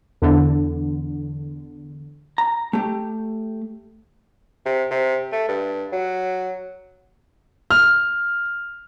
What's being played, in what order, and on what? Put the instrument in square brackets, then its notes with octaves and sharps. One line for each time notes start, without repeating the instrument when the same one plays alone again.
[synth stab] E2 D3
[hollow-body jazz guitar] A#5
A3 G4
[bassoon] C3
C3
A3
G2
F#3
[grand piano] F6